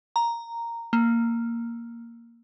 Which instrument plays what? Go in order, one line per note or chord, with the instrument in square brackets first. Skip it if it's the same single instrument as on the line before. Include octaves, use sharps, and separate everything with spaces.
[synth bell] A#5
A#3